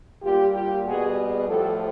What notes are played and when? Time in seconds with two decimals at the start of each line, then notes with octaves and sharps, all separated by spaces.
0.22 A#2 G3 F4 G4
0.53 F4 G4
0.84 B2 G3 F#4 G#4
1.46 A2 F3 G4 A4